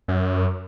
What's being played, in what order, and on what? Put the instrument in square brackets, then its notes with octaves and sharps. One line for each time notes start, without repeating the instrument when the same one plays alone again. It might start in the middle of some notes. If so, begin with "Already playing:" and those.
[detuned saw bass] F#2